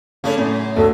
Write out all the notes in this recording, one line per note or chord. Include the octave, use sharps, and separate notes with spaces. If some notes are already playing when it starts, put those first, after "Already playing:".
C#3 A3 C#4 D4 E4
F#2 A2
D2 A4